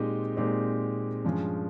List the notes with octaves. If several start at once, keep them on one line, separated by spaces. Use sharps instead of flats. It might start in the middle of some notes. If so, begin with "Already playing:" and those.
Already playing: A#2 G#3 C4 D#4 G4
A#2 G#3 C4 D#4 G4
G2 F3 G#3 C#4